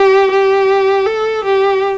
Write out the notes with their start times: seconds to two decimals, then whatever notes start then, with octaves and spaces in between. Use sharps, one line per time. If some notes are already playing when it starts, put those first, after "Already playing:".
Already playing: G4
0.31 G4
1.06 A4
1.45 G4